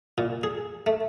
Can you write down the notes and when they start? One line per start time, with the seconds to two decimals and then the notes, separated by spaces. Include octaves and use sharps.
0.18 A#2
0.43 G#4
0.86 A3